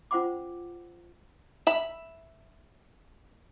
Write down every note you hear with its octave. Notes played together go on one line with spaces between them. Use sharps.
C#4 F4 C5 F#5 B5 D6
E5 B5